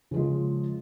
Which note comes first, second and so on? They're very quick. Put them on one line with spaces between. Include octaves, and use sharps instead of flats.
C#3 F3 G#3